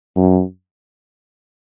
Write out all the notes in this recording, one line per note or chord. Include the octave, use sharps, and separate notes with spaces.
F#2